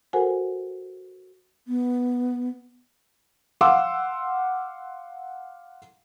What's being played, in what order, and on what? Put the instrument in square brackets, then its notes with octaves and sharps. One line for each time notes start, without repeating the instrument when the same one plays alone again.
[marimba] F#4 A4 A#4 C5 F#5 G#5
[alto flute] B3
[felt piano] F5 F#5 C6 D6 E6